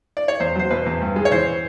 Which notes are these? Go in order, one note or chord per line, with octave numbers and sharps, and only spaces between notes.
D5
C#5
E2 C5
F#3 C5
B2 B4
E2
G2
G#3
C#5
E3 C5